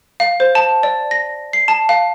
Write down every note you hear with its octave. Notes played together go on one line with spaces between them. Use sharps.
F5
C5
A5
D5
A#6
C7
A5
F5